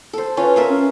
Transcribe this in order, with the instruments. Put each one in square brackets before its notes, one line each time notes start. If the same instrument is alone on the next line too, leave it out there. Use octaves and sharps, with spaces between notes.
[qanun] A4 C5
[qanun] C#4 F4 [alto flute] B4
[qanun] A#4 E5 F5
[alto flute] C#4